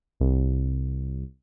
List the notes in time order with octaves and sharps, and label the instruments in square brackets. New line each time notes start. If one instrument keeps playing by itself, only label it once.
[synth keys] C2